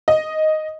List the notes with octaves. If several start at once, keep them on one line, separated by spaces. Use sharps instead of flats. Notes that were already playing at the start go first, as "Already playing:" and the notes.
D#5